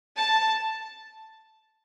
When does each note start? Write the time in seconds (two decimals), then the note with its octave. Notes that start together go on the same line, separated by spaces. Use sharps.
0.16 A5